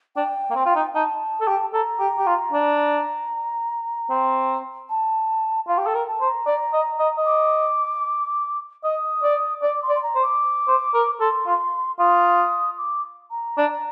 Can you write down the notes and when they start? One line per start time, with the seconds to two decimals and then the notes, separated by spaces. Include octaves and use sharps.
0.16 D4 G5
0.51 A#3
0.56 C4
0.66 F4
0.76 D#4
0.95 D#4 A5
1.41 A4
1.48 G4
1.73 A4 A#5
2.00 G4
2.19 G4
2.27 F4
2.53 D4
4.10 C4
4.90 A5
5.68 F4 F5
5.78 G4
5.87 A4 G5
5.95 A#4
6.08 A5
6.21 C5
6.27 A#5
6.47 D5
6.74 D#5
7.00 D#5
7.18 D#5
7.26 D6
8.84 D#5 D#6
9.23 D5
9.62 D5 D6
9.83 C6
9.89 D5
9.95 C6
10.03 A#5
10.15 C5
10.23 D6
10.68 C5
10.94 A#4
11.21 A4 C6
11.47 F4
11.99 F4 D#6
12.78 D6
13.31 A#5
13.58 D4